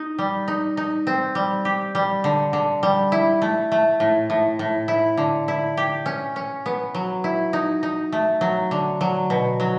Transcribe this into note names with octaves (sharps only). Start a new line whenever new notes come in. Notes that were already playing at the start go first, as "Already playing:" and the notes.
Already playing: D#4
G3
D#4
D#4
C4
G3
G4
G3
D3
D3
G3
E4
A3
A3
A2
A2
A2
E4
D3
E4
G4
C#4
C#4
B3
F#3
E4
D#4
D#4
A3
F#3
D3
F#3
B2
F#3